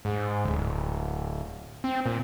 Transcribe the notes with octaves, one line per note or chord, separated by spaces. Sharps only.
G#2
D1
C4
A#2